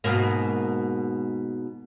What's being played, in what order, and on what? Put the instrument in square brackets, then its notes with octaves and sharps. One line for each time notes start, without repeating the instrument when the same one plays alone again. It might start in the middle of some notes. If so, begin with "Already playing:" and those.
[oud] G#2 B2 A#3